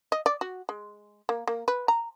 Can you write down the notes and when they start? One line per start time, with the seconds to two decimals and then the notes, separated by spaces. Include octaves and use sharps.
0.12 D#5
0.26 D5
0.41 F#4
0.69 G#3
1.29 A#3
1.47 A#3
1.68 B4
1.88 A#5